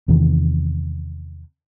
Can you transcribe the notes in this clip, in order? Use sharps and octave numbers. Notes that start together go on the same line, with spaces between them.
E2 C3 D#3